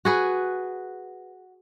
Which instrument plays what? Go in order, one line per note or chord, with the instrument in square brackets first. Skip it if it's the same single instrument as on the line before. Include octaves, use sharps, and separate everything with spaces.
[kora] F#4 G#4 B4